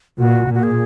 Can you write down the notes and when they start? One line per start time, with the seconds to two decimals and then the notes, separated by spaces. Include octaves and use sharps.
0.19 A#2 F#4
0.48 A#2
0.55 F#4
0.63 G#4